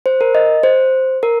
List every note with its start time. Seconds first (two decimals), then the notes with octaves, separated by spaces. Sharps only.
0.06 C5
0.21 A#4
0.35 D#5
0.63 C5
1.23 A#4